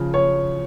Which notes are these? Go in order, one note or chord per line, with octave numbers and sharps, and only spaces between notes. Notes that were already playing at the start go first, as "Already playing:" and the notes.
Already playing: C#3 F3
C#5